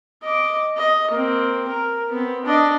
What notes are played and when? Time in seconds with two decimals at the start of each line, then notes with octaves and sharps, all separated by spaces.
0.23 D#5 D6
0.77 D#5
1.11 A#3 C4
1.68 A#4
2.11 B3 C4
2.45 D4 D#5